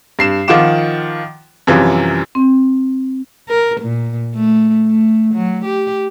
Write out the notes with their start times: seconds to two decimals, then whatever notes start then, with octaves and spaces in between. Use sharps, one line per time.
0.19 G2 C7 E7
0.48 D#3 F3 F4 F#5 D6 E7
1.67 F#2 C3 E3 F3 G3
2.35 C4
3.49 A#4
3.81 A#2
4.35 A3
4.86 A3
5.34 F#3
5.65 G4